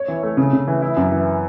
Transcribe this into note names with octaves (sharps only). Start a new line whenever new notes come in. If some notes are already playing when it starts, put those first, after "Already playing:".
Already playing: C#5
E3
A3
C#3
C#3
E3
E4
F#2
E3